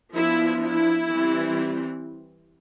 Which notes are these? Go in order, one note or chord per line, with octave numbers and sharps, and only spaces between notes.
F3 B3 D4 E4
E4
E3 G3 C4